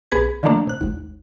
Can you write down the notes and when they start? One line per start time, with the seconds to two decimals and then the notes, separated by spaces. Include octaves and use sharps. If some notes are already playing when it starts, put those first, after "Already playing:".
0.12 B1 B3 G#4 B4 G#6
0.43 D3 D#3 F3 A3 A#3 D4
0.67 C3 F#6
0.81 G#1 D#2